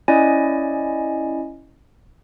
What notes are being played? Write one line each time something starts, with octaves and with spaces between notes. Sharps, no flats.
C#4 E4 D5 D#5 G#5